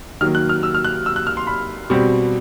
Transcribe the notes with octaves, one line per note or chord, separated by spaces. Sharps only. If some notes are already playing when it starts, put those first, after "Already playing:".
D#3 F#3 A#3 F6
F#6
F6
E6
F6
F#6
E6
F#6
F6
C6
B5
B2 G3 C4